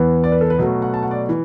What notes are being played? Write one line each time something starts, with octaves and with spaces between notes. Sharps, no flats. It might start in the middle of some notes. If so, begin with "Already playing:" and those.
Already playing: E2 E3 B3
D5
B4
A4
B4
B2 F#3 A3
F#5
A5
F#5
D5
E3